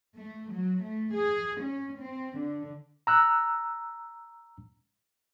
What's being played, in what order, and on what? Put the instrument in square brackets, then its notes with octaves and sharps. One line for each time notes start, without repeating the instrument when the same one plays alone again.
[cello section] A3
F#3
A3
G#4
C#4
C4
D3
[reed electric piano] A#5 E6 F#6